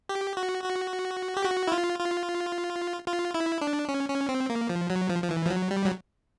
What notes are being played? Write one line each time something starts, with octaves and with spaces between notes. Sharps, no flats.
G4
F#4
F#4
G4
F#4
E4
F4
F4
F4
E4
D4
C#4
C#4
C4
A#3
F3
F#3
F3
F3
E3
F3
F#3
G3
F#3